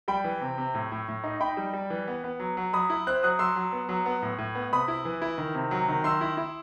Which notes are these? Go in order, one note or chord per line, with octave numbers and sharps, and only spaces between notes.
G3 G5 B5
E3
C3
C3
A2
A2
A2
D#4
D#4 G5 B5
G3
G3
E3
B3
B3
F#3
F#3
F#3 B5 D#6
E4
C4 F#6
F#3 D#6 F#6
F#3 C6 E6
F#3
B3
F#3
B3
A2
A2
B3
C3 B5 D#6
E4
E3
E4
D#3
C3
F#3
D#3
D#3 C6 E6
E4
E4